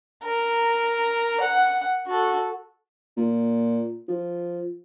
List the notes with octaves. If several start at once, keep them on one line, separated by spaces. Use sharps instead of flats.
A#4
F#5
F#4 A4
A#2
F3